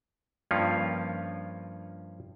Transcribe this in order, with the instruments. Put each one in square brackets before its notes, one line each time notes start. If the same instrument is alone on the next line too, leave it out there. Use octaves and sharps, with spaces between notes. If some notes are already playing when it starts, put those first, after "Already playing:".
[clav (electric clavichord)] G2 F3 A#3 C#4 F4 C#5